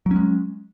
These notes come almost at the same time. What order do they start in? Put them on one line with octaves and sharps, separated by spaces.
F#3 C#4 G#3